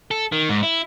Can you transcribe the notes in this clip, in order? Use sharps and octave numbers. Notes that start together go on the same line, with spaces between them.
A4
D#3
G#2
E4